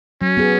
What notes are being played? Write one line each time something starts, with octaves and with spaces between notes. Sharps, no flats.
F#3 C#4
B3 G#4